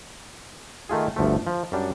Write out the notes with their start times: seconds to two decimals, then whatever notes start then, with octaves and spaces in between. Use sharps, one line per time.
0.89 D#3 A3 F4 G#4
1.16 G1 D2 F3 A3
1.47 F3
1.72 F#2 G3 D4